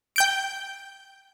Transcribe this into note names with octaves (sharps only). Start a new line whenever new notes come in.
G5 G6 D7